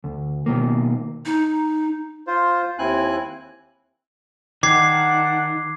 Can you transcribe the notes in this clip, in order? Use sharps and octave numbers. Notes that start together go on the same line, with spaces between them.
D2
B2 D#3 A#3
D#4
F4 C5
D#2 C4 E4 G#5 F#6
D#3 D4 F#5 D6 G#6 C7